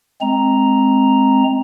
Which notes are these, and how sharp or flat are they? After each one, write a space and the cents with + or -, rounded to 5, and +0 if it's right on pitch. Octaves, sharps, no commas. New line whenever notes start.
G#3 +15 C4 +0 A#5 +0